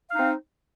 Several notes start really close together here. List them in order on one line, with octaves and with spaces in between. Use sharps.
F5 D#4 C4